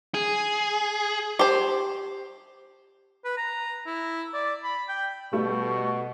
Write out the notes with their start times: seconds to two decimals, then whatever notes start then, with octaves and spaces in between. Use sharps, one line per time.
0.14 G#4
1.39 G4 C5
3.25 B4
3.37 A#5
3.86 E4
4.33 D5
4.63 B5
4.89 G5
5.33 B2 G3 A3 C#6